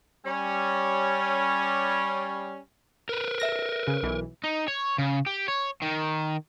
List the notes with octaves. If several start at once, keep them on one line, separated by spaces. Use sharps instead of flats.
G3 C#4
A#4 B4
E5 A#6
C#3
B1 E3
D#4
C#5
C#3
G4
C#5
D#3